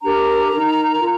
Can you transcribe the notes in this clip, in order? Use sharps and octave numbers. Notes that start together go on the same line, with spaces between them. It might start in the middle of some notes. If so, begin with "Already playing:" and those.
D4 G4 A#4 A#5
D#4 A#4
F4 A#4